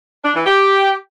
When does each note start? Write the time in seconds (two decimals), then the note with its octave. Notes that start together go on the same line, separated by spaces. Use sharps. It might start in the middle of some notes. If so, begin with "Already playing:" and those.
0.24 D4
0.35 E3
0.45 G4